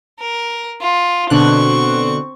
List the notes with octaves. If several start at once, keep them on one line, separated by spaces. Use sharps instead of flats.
A#4
F4
B2 D3 C4 C#6 F#6